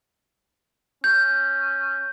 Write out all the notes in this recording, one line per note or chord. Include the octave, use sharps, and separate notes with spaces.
C#4 G6